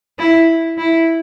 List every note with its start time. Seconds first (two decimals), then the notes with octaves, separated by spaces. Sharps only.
0.19 E4
0.78 E4